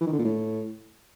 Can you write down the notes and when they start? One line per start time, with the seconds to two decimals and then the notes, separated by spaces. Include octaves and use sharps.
0.01 E3
0.07 D#3
0.13 D3
0.19 A#2
0.25 A2